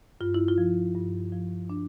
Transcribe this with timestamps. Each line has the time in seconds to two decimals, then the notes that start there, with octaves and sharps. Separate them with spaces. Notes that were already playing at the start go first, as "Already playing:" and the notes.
0.21 G2 F4
0.34 E4
0.48 F4
0.58 F3
0.95 G2
1.32 F3
1.70 D4